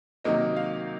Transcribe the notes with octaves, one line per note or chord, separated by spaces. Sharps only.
C3 D#3 F#3 A#3 D#4 D#5
F5